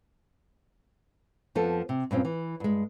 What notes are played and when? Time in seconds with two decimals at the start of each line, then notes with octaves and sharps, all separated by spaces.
1.55 F2 F3 B3 A4
1.89 C3
2.11 G2 A#2 C4 C#4
2.25 E3
2.60 G2 G#3